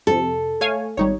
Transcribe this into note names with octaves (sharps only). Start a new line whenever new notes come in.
F2 C3 A4
A3 C#5 F5 G#5
G#1 G3 D#4 C#5